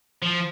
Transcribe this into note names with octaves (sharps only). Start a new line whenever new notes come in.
F3